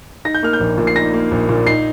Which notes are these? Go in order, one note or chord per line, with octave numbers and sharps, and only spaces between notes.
D#4 A#6
G6
A#3 F6
G6
A#1
A#2
C7
D#4 A#6
A#3
A#1
A#2
D#4 C7